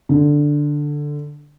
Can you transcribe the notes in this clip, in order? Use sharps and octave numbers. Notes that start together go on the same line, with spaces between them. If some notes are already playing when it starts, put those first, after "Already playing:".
D3